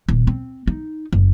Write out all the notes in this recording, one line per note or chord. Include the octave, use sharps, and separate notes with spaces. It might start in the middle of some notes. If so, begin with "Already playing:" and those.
D#1
C4
D#4
F#1